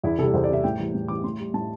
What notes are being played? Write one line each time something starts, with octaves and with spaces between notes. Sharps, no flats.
E2 E4
C3 G3 A4
E2 C5
D5
C3 G3 E5
A2 G5
E3 G3
A2
E3 G3 D6
A2 C6
G3
A2 A5